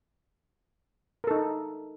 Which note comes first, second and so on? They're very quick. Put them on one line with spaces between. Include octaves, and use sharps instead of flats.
A#4 A4 D#4